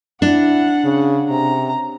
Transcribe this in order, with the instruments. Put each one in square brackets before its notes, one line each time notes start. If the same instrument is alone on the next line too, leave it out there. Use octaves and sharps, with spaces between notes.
[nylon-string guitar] D4 [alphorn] E4 [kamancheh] F#5
[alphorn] C#3
[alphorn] C3 [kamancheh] A#5